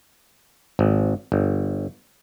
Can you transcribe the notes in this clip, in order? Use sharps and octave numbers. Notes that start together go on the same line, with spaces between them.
G#1
G1